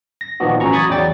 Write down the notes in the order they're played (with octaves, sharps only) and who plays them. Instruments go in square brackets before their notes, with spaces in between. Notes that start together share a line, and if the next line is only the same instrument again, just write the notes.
[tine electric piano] A#6
A#2 D#3 F3 A#3 B3 F#4
A1 F#3 C#4 A#5 C#6
B5 C#6 D#6 G#6 A6
E2 F#3 D5 G5 A6